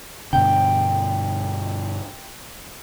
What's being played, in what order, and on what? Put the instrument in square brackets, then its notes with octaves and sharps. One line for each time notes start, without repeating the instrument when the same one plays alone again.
[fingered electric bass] G2 B2 D3 [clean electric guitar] G5